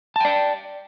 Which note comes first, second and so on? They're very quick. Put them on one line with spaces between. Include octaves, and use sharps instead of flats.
A5 G5 D5